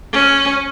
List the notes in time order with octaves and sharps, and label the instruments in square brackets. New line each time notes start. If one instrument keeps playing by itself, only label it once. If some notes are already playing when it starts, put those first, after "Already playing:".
[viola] C#4